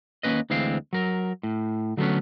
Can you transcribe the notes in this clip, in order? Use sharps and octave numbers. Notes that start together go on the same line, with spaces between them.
D#2 A#3 C#4 B4 D#5
D2 E3 G#3 C4 F5
F#3 A#4
A2
D3 F#3 A3 B3 C#4